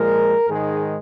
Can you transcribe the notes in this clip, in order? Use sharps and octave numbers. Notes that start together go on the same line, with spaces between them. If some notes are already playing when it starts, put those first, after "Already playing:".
Already playing: A#2 F3 G#3 A#4
G#2 D#3 G#3 G#4